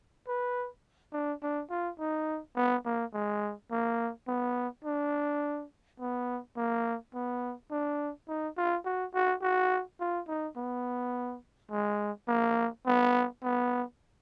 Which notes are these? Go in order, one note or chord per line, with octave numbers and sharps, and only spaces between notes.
B4
D4
D4
F4
D#4
B3
A#3
G#3
A#3
B3
D4
B3
A#3
B3
D4
D#4
F4
F#4
F#4
F#4
F4
D#4
B3
G#3
A#3
B3
B3